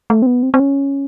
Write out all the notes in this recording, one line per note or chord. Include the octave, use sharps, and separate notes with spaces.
A3
C4
B3
C4
C4
C#4